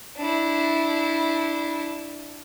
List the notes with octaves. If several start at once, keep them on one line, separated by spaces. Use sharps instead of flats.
D4 E4